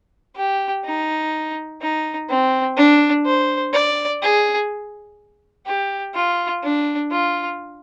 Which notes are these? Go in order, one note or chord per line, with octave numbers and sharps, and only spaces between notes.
G4
D#4
D#4
C4
D4
C5
D5
G#4
G4
F4
D4
F4